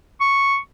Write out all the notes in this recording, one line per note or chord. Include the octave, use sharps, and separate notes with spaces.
C#6